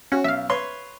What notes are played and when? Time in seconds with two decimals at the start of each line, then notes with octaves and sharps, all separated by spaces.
0.12 C#4 F#4
0.24 B1 E5 F5
0.50 B4 C#5 C6